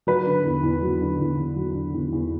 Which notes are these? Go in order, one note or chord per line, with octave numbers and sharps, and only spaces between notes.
F#3 B4
D3
E2
E2
F#3
D3
E2
E2
F#3
D3
E2
E2